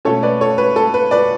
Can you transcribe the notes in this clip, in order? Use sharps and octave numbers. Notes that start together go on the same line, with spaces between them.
B2 A3 C#4 A4 C#5
B4 D5
A4 C#5
B4
A4
B4
B4 D5